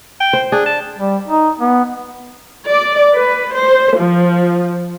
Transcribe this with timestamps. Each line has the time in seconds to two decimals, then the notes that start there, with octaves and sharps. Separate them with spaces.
0.20 G5
0.33 C5
0.52 D4 G#4
0.66 A5
0.98 G3
1.28 D#4
1.60 B3
2.71 D5
3.15 B4
3.55 C5
3.97 F3